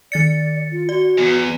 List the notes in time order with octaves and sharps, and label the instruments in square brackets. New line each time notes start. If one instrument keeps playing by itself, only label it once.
[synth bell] D#3 A6 C#7 [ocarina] D5
[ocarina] F4
[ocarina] F#4 [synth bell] D5
[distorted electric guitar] E2